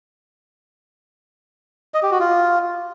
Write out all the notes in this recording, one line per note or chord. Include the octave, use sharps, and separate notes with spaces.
D#5
G4
F#4
F4